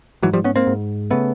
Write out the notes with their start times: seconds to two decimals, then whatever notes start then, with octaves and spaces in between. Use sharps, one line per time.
0.23 G#2 E3 F#3
0.33 F3 G3
0.44 B3 C#4
0.56 A#3 C4
0.67 G#2
1.11 C#3 A3 B3